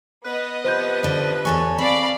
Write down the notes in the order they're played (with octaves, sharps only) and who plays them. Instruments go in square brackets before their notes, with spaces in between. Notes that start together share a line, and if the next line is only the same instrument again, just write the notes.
[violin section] B3 D#5 [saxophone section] B4
[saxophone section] C3 F3 B4 [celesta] C5 G6
[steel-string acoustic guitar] D3 C#4
[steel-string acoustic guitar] E2 A4 C#5 [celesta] G#5 C#6
[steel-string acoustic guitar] C4 [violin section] D5 F5 B5